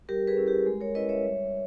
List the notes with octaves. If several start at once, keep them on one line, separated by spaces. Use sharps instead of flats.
G3 G4 A#4
G#4 B4
C#4 E4
G4 A#4
G#3
A#4 C#5
C#4 E4 B4 D#5
C#5 E5
G3